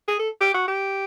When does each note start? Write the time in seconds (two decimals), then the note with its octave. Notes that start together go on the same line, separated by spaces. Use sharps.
0.08 G#4
0.19 A4
0.41 G4
0.54 F#4
0.68 G4